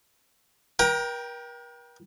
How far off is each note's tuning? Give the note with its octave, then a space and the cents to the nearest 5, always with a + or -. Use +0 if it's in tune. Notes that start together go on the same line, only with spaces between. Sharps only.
A#4 +45 G5 +0 A#5 +15